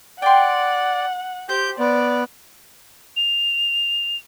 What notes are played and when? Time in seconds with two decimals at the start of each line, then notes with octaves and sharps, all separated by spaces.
0.22 D5 F#5 G5 C6
1.49 G4 C5 G6
1.79 B3 D5
3.17 F7